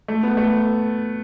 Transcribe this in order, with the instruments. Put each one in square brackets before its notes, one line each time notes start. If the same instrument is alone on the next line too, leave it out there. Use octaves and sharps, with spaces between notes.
[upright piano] A3
B3
A3